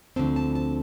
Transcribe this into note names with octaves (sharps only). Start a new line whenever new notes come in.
D2 D3 F3 C4 A5
A5
A5